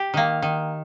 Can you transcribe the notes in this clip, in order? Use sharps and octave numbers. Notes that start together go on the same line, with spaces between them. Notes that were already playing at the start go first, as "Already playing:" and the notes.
Already playing: G4
D#3 A#3
D#3